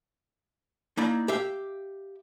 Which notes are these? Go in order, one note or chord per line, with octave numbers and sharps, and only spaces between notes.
A#3 D#4 E4 D5
G4 E5 F5